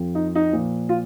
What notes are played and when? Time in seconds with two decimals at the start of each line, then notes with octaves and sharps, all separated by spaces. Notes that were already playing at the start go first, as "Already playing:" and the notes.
Already playing: F2 F3
0.15 D#4
0.35 D#4
0.52 A#2 F3
0.89 F4